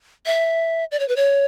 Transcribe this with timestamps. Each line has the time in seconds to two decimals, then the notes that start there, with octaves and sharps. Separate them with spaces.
0.26 E5
0.92 D5
1.00 C#5
1.08 B4
1.16 C#5